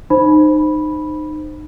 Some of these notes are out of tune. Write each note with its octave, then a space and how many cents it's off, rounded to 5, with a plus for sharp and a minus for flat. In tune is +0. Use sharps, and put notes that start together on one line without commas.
D#4 -25 C5 +0 B5 -10